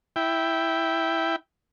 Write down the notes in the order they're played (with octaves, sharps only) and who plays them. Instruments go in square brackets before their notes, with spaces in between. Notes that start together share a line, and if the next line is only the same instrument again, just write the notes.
[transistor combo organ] E4 G5